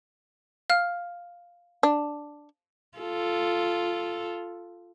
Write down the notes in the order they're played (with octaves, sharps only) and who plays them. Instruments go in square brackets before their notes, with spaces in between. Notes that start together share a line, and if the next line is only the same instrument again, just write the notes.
[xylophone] F5 F6
[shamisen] D4
[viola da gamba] F4 A4